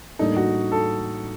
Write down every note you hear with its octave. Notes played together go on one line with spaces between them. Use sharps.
A2 G3 A#3 D4 D#4 A4
F#4
A4